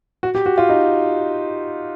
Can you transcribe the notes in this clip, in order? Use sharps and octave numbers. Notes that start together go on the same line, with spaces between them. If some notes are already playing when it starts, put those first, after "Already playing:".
F#4
G4
F#4
F4
D#4